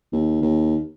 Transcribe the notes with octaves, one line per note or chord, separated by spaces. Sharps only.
D#2
D#2